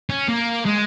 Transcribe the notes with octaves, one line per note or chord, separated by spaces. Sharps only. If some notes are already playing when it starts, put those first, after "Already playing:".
C#4
A#3
G#3